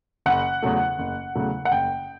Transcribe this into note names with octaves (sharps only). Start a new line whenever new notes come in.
F#1 F#5
E2 C#3 F#3 A3
F#1
E2 C#3 F#3 A3
F#5
F#1 G5